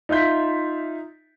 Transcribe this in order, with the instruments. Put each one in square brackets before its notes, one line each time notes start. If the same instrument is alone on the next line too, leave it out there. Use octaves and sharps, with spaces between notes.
[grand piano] D#4 F4 E5 G6 B6